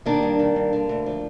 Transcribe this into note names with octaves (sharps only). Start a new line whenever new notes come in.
D#3 A#3 D4
G2
D#3
G2
D3
D2
F3